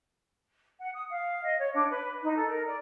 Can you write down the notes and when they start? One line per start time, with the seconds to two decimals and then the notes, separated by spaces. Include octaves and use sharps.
0.80 F#5
0.95 D#6
1.10 F5
1.43 D#5
1.59 C#5
1.75 D4
1.91 B4
2.23 D#4
2.36 A4
2.48 A#4
2.66 D5